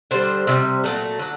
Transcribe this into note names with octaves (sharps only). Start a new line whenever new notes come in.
D3 G3 C5
C3 D#3 G3
A#2 F#3 A3
D3 F#3